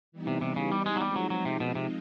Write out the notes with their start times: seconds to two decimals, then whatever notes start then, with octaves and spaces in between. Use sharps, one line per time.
0.12 E3 G3 B3 D#4
0.27 C3
0.41 C3
0.56 C#3
0.72 G3
0.86 G#3
0.96 F#3
1.01 F3 G3 G#3 C4 D#4
1.16 F#3
1.30 F#3
1.45 C3
1.60 B2
1.75 C3